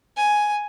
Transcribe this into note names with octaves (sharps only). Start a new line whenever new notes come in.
G#5